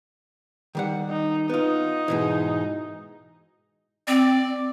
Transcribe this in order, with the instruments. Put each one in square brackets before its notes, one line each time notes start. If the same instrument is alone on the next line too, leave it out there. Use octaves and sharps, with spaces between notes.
[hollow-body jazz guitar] D#3 G3 F#5
[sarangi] D#4
[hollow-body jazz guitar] B3 F4 [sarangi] D#4
[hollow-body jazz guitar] G#2 B2 E3
[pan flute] C4 [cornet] D5